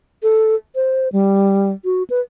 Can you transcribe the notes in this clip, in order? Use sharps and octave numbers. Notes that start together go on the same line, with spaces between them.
A4
C5
G3
F#4
B4